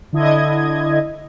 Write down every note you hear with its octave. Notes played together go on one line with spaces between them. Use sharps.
D3 E4 D#5 G#6